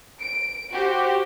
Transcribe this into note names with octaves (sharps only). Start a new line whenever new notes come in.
D7
F#4 G4 C5